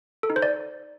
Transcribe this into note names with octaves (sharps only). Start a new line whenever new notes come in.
A4
D#4
C5
D5